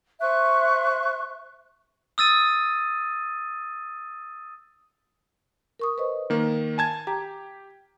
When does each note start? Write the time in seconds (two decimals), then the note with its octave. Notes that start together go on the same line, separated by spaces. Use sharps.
0.20 C5 E5 C#6 F#6
2.18 D#6 E6 A6 D#7
5.80 A#4 C#6 D#6
5.98 B4 C5 D#5
6.30 D#3 A#3
6.78 G#5 A5 G#6
7.07 G4 A#5